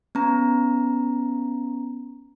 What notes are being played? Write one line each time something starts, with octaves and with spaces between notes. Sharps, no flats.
B3 C#4 A#5